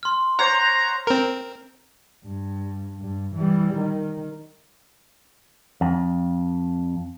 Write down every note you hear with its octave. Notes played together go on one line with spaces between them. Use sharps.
C6 F6
C5 C#5 F#5 A#5
C4 A#4
G2
G2
E3 G3
D#3
F2